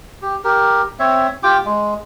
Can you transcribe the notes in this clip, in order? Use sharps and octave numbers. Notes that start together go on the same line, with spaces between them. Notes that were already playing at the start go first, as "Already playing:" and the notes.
G4
G4 A#4
C4 C#5 E5
F4 G4 G5 D6
G#3